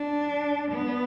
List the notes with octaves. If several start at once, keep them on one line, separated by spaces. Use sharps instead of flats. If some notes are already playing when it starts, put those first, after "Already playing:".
Already playing: D4
B3